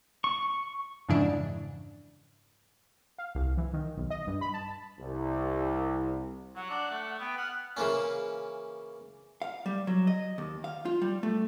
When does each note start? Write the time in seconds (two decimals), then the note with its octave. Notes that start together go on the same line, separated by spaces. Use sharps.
0.24 C#6
1.08 F2 G#2 C#3 E3 D4 E4
3.18 F5
3.35 C2
3.57 E3
3.73 D#3
3.97 B1
4.10 D#5
4.27 G2
4.41 B5
4.54 A5
5.00 C2
6.56 F#3 F#5
6.70 D4
6.91 A3
7.20 B3 G5
7.38 F#5 F6
7.77 C#3 E3 A#3 C#4
9.42 F5
9.66 G3
9.87 F#3
10.07 D#5
10.38 D#2
10.64 F5
10.85 F4
11.02 G3
11.23 A3